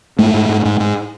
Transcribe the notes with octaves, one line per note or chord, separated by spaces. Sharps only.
G#2 A3
G#2
G#2
G#2
G#2